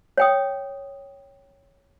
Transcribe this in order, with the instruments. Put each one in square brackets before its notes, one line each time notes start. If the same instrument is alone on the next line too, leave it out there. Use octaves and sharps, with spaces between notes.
[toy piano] C#5 G5 D#6